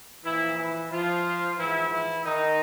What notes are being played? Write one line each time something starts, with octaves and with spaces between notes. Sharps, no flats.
A#2 E3 F3 E4
E3 E4
F3 F4
G#2 E3 F3 E4
E3 E4
D#3 D#4